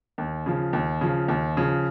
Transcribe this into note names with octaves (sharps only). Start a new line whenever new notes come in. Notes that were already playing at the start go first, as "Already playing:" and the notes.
D#2
C#3 F3
D#2
C#3 F3
D#2
C#3 F3